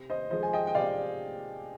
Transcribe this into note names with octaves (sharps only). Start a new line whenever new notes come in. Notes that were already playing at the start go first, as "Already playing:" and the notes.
Already playing: C3
C5 D#5
F3 G#3 C5 D#5
G#5
D#5 G5
G5
C3 D5 F5